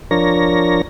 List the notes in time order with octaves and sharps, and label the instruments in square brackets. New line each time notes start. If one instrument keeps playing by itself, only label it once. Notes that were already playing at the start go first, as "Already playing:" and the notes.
[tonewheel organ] F3 D4 A#4 C#5 A#6